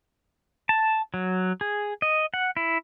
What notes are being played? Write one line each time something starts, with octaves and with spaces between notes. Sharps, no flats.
A5
F#3
G#4
D#5
F#5
E4